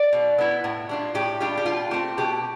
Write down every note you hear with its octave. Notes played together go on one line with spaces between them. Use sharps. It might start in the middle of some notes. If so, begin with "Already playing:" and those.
Already playing: D5
B2
B3 E4
A2
G3 D4 F4
A2 G4
G3 D4 F4 G4
G4
B2 F4
A3 C4 G4
B2 G4